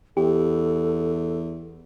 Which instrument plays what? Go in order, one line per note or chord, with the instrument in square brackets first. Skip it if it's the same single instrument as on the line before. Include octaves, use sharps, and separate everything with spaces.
[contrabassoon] E2 [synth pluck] G4 [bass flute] A4